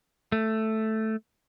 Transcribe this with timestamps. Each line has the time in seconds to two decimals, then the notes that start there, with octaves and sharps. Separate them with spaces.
0.32 A3